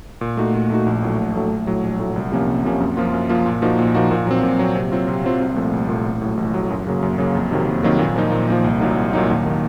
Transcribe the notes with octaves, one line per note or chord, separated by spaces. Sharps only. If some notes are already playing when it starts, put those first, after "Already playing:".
A#2
A3 D#4 F#4
A#2
A3 D#4 F#4
A#1
A2 F#3 A3
A#1
A2 F#3 A3
A#1
A2 F#3 A3
A#1
A2 F#3 A3
C2
C3 F3 A#3 C#4
C2
C3 F3 A#3 C#4
F#2
F3 A#3 F4
F#2
F3 A#3 F4
A#2
F3 A#3 D#4 F#4
A#2
F3 A#3 D#4 F#4
A#2
F#3 C4
A#2
F#3 C4
C3
F#3 C4 F4
C3
F#3 C4 F4
C2
A#2 F3 A3
C2
A#2 F3 A3
A1
A2 F#3
A1
A2 F#3
F#2
C#3 F#3 A#3
F#2
C#3 F#3 A#3
F2
C3 D#3 F#3 A#3
F2
C3 D#3 F#3 A#3
A#2
F3 A#3 D#4
A#2
F3 A#3 D#4
C2
A#2 F#3 A#3 D#4
C2
A#2 F#3 A#3 D#4
D#2
D#3 A#3